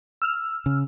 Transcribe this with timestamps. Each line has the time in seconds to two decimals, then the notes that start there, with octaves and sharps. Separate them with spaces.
0.22 E6 F6
0.66 C#3